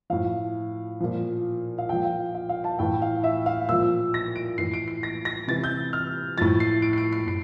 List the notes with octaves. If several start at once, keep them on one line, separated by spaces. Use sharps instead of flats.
A2 F3 F5
A#2 F3
F5
A#2 F3 G5
F5
F5
F5
A5
A2 E3 G5
F5
E5
F5
A#2 F3 E6
A#6
D7
A2 E3 C7
D7
C7
A#6
A#6
C3 E3 A6
G6
F6
A2 F3 A6
C7
D7
C7
D7
C7
A2 C7